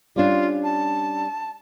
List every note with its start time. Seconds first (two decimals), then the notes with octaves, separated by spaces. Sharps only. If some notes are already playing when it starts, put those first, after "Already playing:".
0.16 G3 C#4 D4 F4
0.64 A5